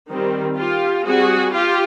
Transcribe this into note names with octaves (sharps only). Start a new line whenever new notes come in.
D#3 G3 C4
F4 G4
G3 C4 F#4 G#4
F4 G4